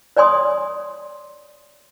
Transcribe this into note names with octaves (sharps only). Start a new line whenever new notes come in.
C#5 D5 G#5 C6 D#6